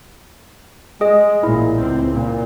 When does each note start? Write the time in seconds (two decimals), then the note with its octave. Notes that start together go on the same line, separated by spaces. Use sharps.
1.01 G#3 G#4 D#5
1.43 A1 A#2 E4
1.80 C#2 C4
2.14 A#2